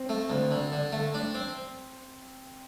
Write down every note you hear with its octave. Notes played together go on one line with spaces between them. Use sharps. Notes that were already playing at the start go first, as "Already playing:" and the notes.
Already playing: C4
A3
D2
D3
D3
A3
D4
C4